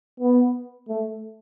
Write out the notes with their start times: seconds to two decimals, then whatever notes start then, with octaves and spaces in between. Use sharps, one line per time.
0.20 B3
0.89 A3